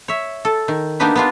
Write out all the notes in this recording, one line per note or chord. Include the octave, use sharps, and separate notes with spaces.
C#5 E5
A4
D#3
A#3 B3 D4 D#4 G4 B4
B3 D4 F4